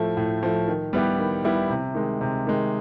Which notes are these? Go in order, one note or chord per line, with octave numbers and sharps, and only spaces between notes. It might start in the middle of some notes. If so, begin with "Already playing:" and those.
Already playing: A2 F3 A3
A2
F3 A3
D#3
G3 B3 E4 G4
D#3
G3 B3 E4 G4
C3
D#3 G#3
C3
D#3 G#3